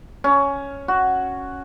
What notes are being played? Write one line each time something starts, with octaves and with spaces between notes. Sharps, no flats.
C#4
F#4